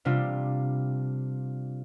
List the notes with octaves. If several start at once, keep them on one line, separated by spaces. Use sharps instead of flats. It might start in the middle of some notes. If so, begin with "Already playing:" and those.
C3 G3 D4 F4